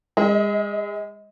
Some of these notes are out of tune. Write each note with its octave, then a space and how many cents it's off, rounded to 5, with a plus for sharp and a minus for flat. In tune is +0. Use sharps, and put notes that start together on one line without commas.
G#3 -35 D#5 +30